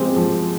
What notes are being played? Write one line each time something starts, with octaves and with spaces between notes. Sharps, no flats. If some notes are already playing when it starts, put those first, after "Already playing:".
Already playing: F3 G#3 C4 G4 C5
F3